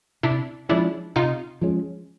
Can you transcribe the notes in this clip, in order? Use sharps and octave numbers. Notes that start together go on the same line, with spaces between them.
C3 D4 E4
F3 G#3 C#4 D4 E4
C3 D#4 F4
F3 G#3 C#4